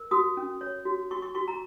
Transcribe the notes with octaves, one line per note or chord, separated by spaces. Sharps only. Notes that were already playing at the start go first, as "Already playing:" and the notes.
Already playing: A#4
F#4 D#6
C#4
C#5
F#4
F#4 C#6
C#6
F#4 C#6
A#5